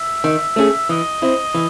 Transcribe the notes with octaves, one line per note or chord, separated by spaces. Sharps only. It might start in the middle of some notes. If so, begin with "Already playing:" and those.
Already playing: E5
D#3
A3 C#4 G#4
E3 D#5
C4 E4
E3